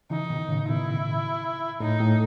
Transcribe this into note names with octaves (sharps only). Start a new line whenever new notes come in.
C#3 E3 D#4
B2 D#3
A2 C#3
B2 E4
A2 D#4
A2